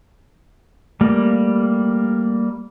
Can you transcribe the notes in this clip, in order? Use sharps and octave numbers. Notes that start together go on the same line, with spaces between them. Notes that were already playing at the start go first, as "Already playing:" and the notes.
G3 A3 A#3